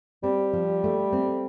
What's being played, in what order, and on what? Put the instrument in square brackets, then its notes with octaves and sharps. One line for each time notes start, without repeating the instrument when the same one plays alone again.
[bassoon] G3 [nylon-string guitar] C4
[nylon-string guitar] F3
A3
C4